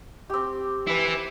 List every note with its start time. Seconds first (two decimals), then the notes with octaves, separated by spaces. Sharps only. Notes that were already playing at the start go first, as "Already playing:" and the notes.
0.30 C4 G4
0.87 E4 B4